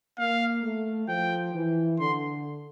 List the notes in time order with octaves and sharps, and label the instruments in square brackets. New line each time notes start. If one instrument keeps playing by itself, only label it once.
[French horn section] A#3 [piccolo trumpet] F5
[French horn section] A3
[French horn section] F3 [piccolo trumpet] G5
[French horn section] E3
[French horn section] D3 [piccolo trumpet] C6